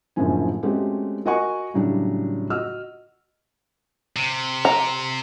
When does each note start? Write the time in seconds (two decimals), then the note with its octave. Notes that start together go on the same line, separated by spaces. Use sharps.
0.16 F#1 F#2 A2 D3 F3 G#5
0.63 G#3 A3 C4 C#4 F#4 G4
1.26 F#4 A#4 D#5 F#5 G#5 C#6
1.74 A2 C#3 F#3 G3 D4
2.50 F#4 D#5 E6 F6
4.16 C3
4.65 A#5